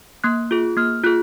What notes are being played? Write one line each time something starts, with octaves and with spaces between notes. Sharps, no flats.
A#3 F#6
F4 G#4
A#3 F6
F4 G#4 F#6